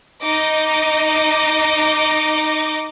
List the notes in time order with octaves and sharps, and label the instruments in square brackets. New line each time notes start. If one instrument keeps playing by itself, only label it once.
[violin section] D#4 D#5 D6